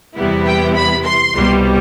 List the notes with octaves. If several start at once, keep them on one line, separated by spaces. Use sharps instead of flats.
E2 C3 G3 B3 E4
G5
B5
C6
C2 B2 G3